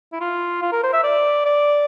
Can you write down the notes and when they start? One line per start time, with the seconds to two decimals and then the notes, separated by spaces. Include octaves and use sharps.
0.13 E4
0.21 F4
0.63 F4
0.72 A#4
0.84 C5
0.93 E5
1.04 D5
1.45 D5